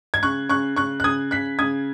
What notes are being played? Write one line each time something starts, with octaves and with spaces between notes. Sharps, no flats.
G#6
C#3 C#6 F#6
C#3 C#6 F#6
C#3 C#6 F#6
F#6
C#3 D#6 G#6
C#3 F#6 B6
C#3 D#6 G#6